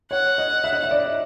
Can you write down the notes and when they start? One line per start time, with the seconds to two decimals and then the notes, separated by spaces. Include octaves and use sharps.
0.11 C#5 F#5
0.38 D#5
0.64 E5
0.73 D#5
0.83 E5
0.91 D5